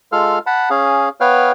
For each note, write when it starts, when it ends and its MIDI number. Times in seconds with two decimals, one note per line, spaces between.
0.12 0.39 56
0.12 0.39 65
0.12 0.39 69
0.12 0.39 77
0.12 0.39 89
0.46 0.69 78
0.46 0.69 81
0.46 0.69 83
0.70 1.09 61
0.70 1.09 68
0.70 1.09 77
1.21 1.52 59
1.21 1.52 71
1.21 1.52 73
1.21 1.52 77
1.21 1.52 79
1.21 1.52 89